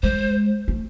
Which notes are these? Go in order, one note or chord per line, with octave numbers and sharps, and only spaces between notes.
G#3 C5
A3